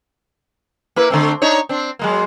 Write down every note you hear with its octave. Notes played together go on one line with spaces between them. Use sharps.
A#3 E4 B4
D3 A3 C4
D4 D#4 C#5
C4 D4
F#3 G#3 A#3